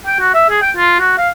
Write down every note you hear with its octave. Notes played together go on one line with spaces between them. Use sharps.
G5
F#4
E5
G#4
G5
F4
F#4
F5